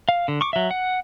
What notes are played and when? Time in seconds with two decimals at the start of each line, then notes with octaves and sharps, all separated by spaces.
0.09 F5
0.28 D3
0.41 C#6 D6
0.53 F#3 E5
0.71 F#5